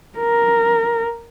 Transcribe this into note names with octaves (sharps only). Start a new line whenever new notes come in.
A#4